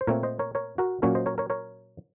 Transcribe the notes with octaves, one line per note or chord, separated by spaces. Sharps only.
C5
A#2 A3 C4 A#4 C#5
C5 D#5
A#4 C#5
A#4 C#5
F#4 A#4
A#2 F#3 A#3 C#4 A#4 C#5
C5 D#5
A#4 C#5
A#4 C#5
A#4 C#5